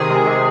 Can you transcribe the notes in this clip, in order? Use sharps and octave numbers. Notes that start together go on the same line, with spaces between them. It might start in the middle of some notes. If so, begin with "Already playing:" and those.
Already playing: C3 D#3 G#4
G#3
C3